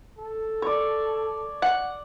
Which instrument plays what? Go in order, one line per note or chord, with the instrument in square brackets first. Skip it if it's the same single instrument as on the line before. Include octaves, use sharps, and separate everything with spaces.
[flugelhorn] A4
[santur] C#5 D5
[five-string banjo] F#5